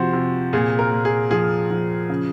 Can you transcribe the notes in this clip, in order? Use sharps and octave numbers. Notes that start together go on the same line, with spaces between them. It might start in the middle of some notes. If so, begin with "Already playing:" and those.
Already playing: C3 F3 F#4 C5
C3
A#2 G#4
A#4
A#2
G#4
F3 G#4
F3
C#3